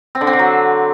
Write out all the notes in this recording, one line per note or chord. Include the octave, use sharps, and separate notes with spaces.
C4
D3
C4
D3
F#3